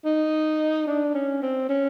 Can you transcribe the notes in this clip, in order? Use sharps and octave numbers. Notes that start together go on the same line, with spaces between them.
D#4
D4
C#4
C4
C#4